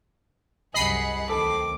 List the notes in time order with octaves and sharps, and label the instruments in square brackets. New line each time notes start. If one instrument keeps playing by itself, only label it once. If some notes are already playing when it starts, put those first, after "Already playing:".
[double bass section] C2 F#2 [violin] G#4 F#5 [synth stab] D#5 B5 C7
[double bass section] D2 D#3 C4 [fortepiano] A4 [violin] D6